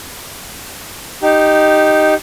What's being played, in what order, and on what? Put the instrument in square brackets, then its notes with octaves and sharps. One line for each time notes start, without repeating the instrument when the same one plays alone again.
[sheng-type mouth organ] D#4 G4